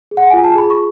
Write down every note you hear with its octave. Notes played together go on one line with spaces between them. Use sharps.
G#4
F#5
F4 G#5
A5
G#4 B5
C#6